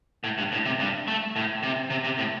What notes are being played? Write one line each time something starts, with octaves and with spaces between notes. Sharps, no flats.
A2
G2
A2
C3
G2
A3
A2
C3
C3
C3
A2